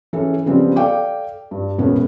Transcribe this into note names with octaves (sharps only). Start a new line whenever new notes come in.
E3 C#4 G#4 A4
C#3 F3 G3 B3 C4
A4 D5 F5 G5 D6
G2
E1 E2 A2 B3 C#4